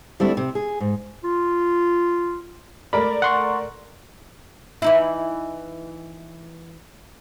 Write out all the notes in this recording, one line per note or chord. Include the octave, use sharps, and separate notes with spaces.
D3 G3 A3 C4 D4 E4
C3
G#4
G#2
F4
A3 A#4 D5 B5
F#5 C6 C#6
E3 D#4 E4